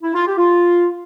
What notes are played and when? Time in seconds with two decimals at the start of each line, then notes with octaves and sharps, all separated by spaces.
0.03 E4
0.15 F4
0.26 G4
0.38 F4